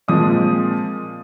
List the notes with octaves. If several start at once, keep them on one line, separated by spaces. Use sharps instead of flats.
A#2 F3 G#3 C4 D#6